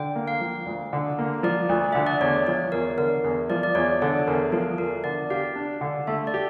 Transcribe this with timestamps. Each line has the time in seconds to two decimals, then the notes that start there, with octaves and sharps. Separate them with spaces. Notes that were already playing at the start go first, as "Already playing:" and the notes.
Already playing: D3 G5
0.16 A#3
0.28 F5
0.40 F3
0.66 D2
0.93 D3
1.19 A#3
1.43 F3 D5
1.69 D2
1.92 D3 E5
2.07 D5
2.21 E2 C#5
2.47 F3 C#5
2.72 E2 A#4
2.98 D3 A#4
3.24 E2
3.50 F3 D5
3.63 D5
3.75 E2 C#5
4.02 D3 A4
4.27 E2 A#4
4.52 F3 A4
4.78 E2 A#4
5.04 D3 D5
5.30 G4 F5
5.56 D4
5.81 D3
6.07 A3 E5
6.27 D5
6.34 G4